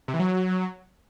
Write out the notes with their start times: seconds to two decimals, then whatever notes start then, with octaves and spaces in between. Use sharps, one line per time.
0.08 C3
0.14 E3
0.19 F#3